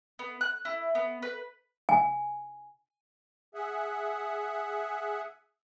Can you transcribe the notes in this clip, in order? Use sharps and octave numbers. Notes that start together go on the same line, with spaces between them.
B3
F#6
E4
B3
B4
G#5
G#4 E5 F#5